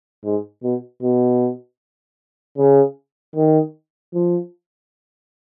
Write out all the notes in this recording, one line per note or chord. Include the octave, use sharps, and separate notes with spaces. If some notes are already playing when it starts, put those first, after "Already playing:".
G#2
B2
B2
C#3
D#3
F3